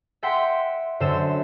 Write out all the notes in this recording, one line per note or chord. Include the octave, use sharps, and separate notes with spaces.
E5 F#5 G5 C6 G6 B6
F#2 D3 C5 E6 E7